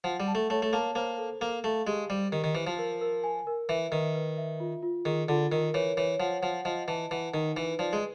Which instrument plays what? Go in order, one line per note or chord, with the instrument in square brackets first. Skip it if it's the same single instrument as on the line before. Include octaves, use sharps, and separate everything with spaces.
[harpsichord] F3 [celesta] F#5
[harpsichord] G3
[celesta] A5
[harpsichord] A3
[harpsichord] A3 [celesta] C#5
[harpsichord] A3
[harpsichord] A#3 [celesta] A5
[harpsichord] A#3 [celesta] C5
[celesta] A4
[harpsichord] A#3 [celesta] A4
[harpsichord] A3 [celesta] F5
[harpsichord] G#3 [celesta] G4
[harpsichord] G3 [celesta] C5
[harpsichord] D#3 [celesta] G4
[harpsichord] D#3
[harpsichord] E3 [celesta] C5
[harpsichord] F3
[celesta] A#4
A#4
G#5
A#4
[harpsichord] E3 [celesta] E5
[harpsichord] D#3 [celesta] B4
[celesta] B4
E5
F4
F4
[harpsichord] D#3 [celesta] G#4
[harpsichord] D3 [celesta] F4
[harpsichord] D#3 [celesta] A#4
[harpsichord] E3 [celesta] C#5
[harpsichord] E3 [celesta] C#5
[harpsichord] F3 [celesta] F#5
[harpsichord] F3 [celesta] F#5
[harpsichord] F3 [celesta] D#5
[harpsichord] E3 [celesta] A5
[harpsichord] E3 [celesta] F#5
[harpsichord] D#3 [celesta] D#4
[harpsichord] E3 [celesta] B4
[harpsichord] F3 [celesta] D5
[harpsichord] G#3